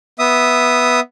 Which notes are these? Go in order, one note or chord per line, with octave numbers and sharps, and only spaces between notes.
B3 E5 D#6